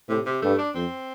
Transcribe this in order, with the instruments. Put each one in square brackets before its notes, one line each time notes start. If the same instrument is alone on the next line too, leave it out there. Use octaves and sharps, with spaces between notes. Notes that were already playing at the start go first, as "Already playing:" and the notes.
[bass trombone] A2 [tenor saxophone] C3
[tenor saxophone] C3
[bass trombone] G2 [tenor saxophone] A3
[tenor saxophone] D4
[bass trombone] F2 [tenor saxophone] C4